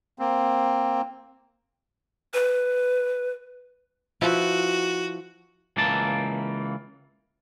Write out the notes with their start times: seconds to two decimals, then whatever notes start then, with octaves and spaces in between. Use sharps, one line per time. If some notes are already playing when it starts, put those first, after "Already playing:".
0.19 A#3 C4
2.34 B4
4.21 F3 E4 F#4 B4
5.77 C#2 E3 A#3 A5